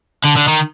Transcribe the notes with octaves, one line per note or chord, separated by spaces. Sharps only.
D3
D3
D#3